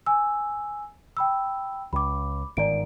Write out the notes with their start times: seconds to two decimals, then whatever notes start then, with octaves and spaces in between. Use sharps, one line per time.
0.06 G#5 E6
1.17 G5 B5 E6
1.93 C#2 B5 D6
2.57 G1 G#2 D#3 D5 D7